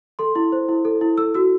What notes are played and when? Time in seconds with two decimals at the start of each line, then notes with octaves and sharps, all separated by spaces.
0.19 A4 C6
0.35 E4
0.52 C5
0.69 E4
0.85 A4
1.01 E4
1.18 A4 E6
1.34 F#4 E6